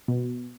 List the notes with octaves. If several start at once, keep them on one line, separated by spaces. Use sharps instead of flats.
B2